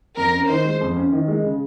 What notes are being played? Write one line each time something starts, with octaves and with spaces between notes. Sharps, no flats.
F2 A#4
C#4
D#3 C5
G#3
F2
C#4
D#3
G#3
C#3